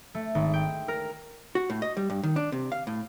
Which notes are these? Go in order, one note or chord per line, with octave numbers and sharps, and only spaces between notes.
A3
G#1
G5
A#4
F#4
A2
D#5
G3
G2
D#3
D4
C3
F5
A2